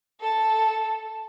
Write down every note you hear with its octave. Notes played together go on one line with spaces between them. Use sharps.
A4 A5